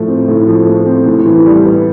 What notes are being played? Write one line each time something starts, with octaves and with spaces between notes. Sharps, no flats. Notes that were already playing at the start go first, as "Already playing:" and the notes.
Already playing: A2 F3 A3
C4
A2
F3
A3
C4
A2
E3
G3
B3